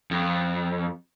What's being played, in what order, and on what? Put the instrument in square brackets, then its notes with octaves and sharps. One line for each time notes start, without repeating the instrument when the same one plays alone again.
[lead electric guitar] F2